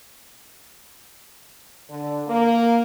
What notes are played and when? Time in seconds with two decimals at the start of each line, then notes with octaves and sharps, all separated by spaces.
1.89 D3
2.28 A#3